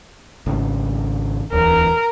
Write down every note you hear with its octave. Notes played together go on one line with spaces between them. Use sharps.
G#1 C#3
D1 E2 A#4